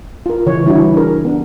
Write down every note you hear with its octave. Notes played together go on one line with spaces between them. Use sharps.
F4 A#4
C#3 E3 C#5
D3 E3 G3 D4 E4 F#4
D4 G4 G#4 A#4
B3 D4